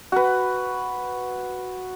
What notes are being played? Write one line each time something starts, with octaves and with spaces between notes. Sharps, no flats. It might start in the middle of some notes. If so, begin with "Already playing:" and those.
F#4 B4